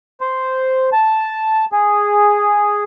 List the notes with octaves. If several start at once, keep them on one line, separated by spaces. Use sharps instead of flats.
C5
A5
G#4